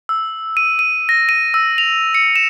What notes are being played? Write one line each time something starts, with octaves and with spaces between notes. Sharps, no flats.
E6
D#7
D#7
A#6
D#7
E6
F7
C#7
E7